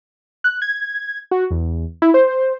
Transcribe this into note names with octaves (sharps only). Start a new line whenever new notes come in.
F#6
G#6
F#4
E2
E4
C5